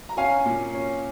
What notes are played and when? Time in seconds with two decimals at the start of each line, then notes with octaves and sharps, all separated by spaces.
0.09 A#5
0.17 C#4 F5 G#5
0.45 A#2
0.74 C#4